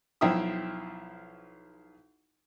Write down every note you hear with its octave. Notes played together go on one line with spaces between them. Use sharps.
B1 F3 E4 G5 D#6